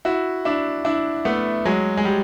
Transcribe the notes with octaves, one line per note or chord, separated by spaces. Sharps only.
E4 F#4
D4 E4
D4 E4
A3 B3
F#3 G#3
G#3
G3